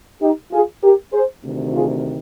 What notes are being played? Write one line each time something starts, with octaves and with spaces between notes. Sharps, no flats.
D#4 G4
F4 G#4
G4 A#4
G#4 C5
D2 C3 D#3
F4 G#4